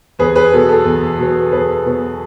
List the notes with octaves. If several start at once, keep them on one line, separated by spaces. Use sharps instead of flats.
E2 G#4 B4
G#4 B4
B2 F#3 B3 A4
A4
E2
B2 F#3 B3
E2 G#4 B4
B2 F#3 B3